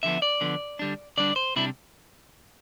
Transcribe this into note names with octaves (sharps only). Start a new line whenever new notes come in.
D3 F3 B3 E5
D5
D3 F3 B3
D3 G3 D4
D3 G3 D4 D5
C5
C3 G3 D4 E4